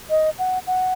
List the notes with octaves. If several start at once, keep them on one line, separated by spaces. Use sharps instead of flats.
D#5
F#5
F#5